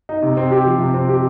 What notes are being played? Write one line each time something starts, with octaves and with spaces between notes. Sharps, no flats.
D#4
C3
C4
G4
F3
C3
C4
G4